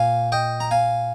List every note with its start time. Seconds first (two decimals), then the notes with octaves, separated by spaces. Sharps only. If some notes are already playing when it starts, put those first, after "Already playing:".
Already playing: A#2 F5 G#5
0.32 D#5 G5
0.60 A#5
0.71 F5 G#5